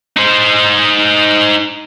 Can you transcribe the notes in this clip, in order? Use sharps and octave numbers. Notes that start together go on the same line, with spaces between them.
D#4 C5